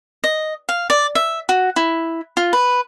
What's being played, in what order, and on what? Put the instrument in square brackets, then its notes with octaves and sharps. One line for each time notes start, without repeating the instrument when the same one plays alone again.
[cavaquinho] D#5
F5
D5
E5
F#4
E4
F4
B4